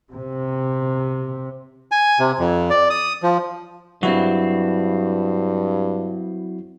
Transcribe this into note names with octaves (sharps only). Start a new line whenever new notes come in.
C3
G#5
C3
F2
D5
D#6
F3
G2 F#3 C4 E4 F#4